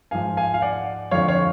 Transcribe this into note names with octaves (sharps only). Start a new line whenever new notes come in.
G#2 F3 F5 G#5
F5 G#5
F5
D5 F#5
F2 D3 F3 C#5 F5
C#5 F5